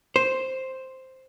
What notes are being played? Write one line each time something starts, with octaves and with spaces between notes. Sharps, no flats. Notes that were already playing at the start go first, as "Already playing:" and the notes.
C5